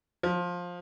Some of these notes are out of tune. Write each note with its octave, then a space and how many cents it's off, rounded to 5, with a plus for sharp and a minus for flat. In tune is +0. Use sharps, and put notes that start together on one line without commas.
F3 +15